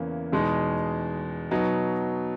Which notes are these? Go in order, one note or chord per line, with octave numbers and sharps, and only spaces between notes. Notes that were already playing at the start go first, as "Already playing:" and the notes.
Already playing: E2 C#3 E3 A#3 C#4
E2 B2 G#3 D#4
B2 F#3 B3 D#4